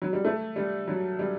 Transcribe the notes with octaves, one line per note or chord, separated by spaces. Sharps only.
F#3
G3
A3
G3
F#3
G3